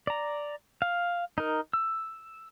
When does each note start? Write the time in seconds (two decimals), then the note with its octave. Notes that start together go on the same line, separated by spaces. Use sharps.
0.07 D5 A#5
0.82 F5
1.38 D#4 A#4
1.73 E6